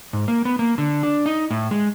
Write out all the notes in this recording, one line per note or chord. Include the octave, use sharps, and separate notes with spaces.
G#2
A#3
B3
A#3
D3
D4
D#4
A2
G#3